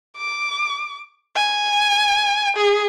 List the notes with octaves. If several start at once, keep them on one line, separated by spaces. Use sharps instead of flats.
D6
G#5
G#4